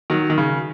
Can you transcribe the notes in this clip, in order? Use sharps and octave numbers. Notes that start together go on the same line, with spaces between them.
D#3 F#3
D#3
C#3